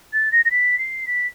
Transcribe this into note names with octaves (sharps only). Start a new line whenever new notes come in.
A6
A#6
A#6
B6
C7
B6